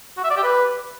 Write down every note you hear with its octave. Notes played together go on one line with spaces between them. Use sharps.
F#4
E5
D5
G4
B4